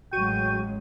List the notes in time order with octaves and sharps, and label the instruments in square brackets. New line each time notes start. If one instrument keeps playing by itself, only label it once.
[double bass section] A1 F#3 G#3 [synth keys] F#4 C#6 D#7 [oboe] G5